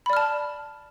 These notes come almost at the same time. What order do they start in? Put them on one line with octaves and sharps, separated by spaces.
B5 D5 F6 A5